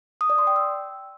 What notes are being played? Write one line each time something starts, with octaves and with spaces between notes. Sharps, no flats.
D#6
D5
C6
G5
E6